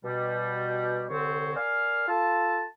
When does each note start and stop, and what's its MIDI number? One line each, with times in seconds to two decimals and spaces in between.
0.05 1.04 47
0.05 1.04 55
1.09 1.55 36
1.09 1.55 50
1.09 1.55 60
1.09 1.55 73
1.56 2.05 70
1.56 2.05 74
1.56 2.05 77
1.56 2.05 80
1.56 2.05 89
2.08 2.64 65
2.08 2.64 69
2.08 2.64 81